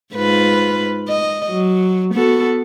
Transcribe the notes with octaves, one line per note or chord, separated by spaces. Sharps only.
G#2 F4 B4
D#5
F#3
B3 F#4 A4